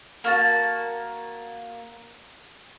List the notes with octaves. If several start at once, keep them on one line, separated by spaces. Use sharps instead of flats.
A#3 F#4 A5